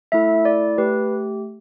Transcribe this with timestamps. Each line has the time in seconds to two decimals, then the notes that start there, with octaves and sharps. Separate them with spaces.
0.12 A3 E4 A4 E5
0.45 D5
0.78 A3 G4 B4